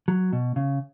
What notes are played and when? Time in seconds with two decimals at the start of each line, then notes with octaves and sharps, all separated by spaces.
0.08 F#3
0.33 B2
0.56 C#3